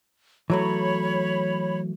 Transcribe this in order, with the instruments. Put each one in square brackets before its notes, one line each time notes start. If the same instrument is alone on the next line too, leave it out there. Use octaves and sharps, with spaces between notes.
[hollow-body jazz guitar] E3 F#3 A3 [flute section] C#5 B5